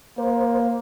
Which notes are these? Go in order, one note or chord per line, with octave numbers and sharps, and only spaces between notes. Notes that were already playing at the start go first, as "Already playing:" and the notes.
A#3 C5